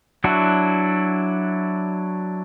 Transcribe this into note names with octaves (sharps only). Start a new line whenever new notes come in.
F#3 D4 E4 F#4